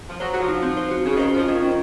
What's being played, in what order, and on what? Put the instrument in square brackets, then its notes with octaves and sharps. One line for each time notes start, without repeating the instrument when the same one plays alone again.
[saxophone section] F3
[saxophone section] F#3 [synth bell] C5
[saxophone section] F#3 [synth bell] F#4
[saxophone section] F3
[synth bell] D#4
C4
C5
F#4
[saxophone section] C#3 [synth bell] C#4
[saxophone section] D#3 [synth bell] C5
[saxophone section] F3 [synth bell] F4
[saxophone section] D#3 [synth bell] C#4
[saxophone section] D#3 [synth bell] C#4